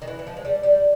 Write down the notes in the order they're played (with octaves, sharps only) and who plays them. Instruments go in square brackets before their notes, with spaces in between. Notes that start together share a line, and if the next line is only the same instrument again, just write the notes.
[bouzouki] D#3
E3
E3
F3
G#3
G3
G3